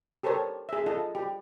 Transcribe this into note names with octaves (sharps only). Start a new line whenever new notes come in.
G4 A4 A#4 C5 C#5
G#4 E5
F4 A4 D#5
G4